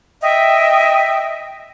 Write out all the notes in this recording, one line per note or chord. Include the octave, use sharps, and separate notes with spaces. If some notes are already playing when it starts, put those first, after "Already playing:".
D#5 E5 G5